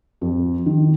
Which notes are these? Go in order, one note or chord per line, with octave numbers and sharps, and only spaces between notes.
F2
D#3